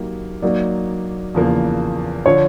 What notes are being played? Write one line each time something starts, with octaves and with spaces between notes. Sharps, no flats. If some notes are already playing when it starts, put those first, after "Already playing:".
Already playing: F#3 A#3 D#4 G4
F#3 A#3 D#4 D5
E2 C#3 F3 A#3
D3 F3 C#5